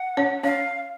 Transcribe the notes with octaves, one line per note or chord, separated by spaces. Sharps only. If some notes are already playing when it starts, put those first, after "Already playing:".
Already playing: F#5
C#4 C#5
C#4 C#5 F5